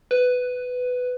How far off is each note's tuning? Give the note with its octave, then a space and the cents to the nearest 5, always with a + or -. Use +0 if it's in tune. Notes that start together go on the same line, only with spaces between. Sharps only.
B4 +10